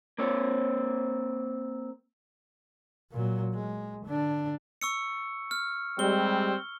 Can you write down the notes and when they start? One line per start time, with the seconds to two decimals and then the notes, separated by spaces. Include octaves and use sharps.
0.18 A#3 C4 C#5
3.11 A#2 F#3
3.54 G#3
4.06 D3 D4
4.82 C#6 E6 C#7
5.51 F6
5.99 G3 G#3 C4 G7